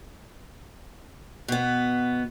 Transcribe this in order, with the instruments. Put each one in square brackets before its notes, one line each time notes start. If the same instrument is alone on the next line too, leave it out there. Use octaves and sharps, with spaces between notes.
[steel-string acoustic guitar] B2 B3